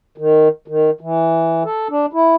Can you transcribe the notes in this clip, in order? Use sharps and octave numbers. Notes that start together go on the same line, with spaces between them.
D#3
D#3
E3
A4
D4
E4